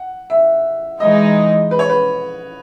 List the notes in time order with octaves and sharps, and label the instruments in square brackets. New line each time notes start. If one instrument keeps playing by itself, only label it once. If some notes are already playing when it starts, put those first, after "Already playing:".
Already playing: [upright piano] F#5
E5
[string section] E3 G#3 D#4 [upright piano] D#5
[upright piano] B4
C#5
B4